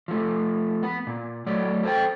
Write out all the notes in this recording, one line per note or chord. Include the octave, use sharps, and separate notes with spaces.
F3 A3
B3 B4
A#2
F#3 A3 D5
A4 C5 G5